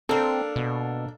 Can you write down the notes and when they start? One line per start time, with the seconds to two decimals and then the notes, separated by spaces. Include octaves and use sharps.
0.09 A#3 C4 D4 A4
0.56 B2